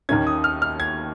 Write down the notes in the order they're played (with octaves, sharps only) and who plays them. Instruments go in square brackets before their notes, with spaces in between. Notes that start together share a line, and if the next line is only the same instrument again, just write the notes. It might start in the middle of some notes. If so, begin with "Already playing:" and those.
[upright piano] D#2 D#3 A#3 C#4 [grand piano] G#6
[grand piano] D#6
F6
F6
G#6